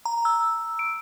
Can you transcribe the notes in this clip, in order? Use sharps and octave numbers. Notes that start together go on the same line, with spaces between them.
A#5
E6
D7